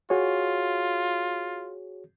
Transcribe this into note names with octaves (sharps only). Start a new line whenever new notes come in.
F4 F#4 G#4 C#5